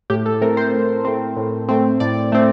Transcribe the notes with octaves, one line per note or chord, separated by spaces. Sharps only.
A2 G4
A4
A3 C4 A#4
C5
A2
A3 C4
A2
A3 C4
A2 D5
A3 C4